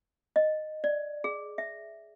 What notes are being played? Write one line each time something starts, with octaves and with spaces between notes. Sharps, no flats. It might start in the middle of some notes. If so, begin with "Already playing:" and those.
D#5
D5
G#4
E5